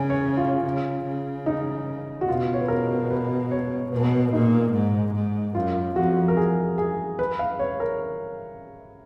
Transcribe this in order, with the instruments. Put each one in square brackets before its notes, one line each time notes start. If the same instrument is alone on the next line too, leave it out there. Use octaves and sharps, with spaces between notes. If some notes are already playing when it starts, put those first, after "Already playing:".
Already playing: [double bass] C#3 [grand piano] G#5
[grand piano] C#5
F4
[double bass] C#3
C#3
[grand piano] D#4
F#4
[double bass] B2 [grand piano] F4
[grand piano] C#5
B4
A#4
B4
C#5
[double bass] B2 [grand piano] B4
[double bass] A#2 [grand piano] D#4
[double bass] G#2
G#2
[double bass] F#2 [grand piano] F4
[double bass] F2 [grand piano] F#4
[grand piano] A#4
G#4
G#4
B4
F5
C#5
A#4